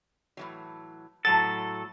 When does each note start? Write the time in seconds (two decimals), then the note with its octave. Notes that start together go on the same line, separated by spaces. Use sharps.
0.37 A2 E3 F#3
1.25 A2 F#3 A4 F#5 A5 A6